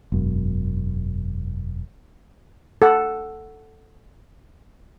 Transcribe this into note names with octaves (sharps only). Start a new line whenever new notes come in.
E1 F#2
A4 F#5